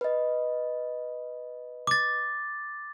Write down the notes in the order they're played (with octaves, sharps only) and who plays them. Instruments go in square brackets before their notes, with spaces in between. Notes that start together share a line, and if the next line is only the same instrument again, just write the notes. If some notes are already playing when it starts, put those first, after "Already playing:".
[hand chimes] B4 D#5
[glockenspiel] D6 A6